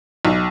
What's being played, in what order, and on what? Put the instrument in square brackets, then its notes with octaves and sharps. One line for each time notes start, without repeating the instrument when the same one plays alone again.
[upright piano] B1